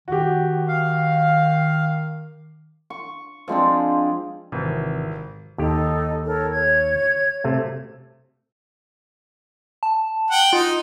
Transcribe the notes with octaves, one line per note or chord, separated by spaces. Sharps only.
D#3 F#4 G4
F5
C#6
F3 G#3 C4 D4
G#1 C3 E3
D#2 D#4 G4 A4
A4 A#4 C#5
C#5 G#6
C3 A3
A5
F#5 G5
D#4 F4